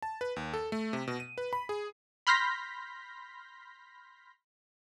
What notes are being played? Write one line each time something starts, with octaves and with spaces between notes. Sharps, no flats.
A5
B4
D#2
A4
A3
C3
B2
D#7
B4
B5
G#4
B5 C6 F6 G6 A#6 B6